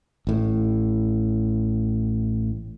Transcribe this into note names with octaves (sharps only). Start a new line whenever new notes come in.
A1 A2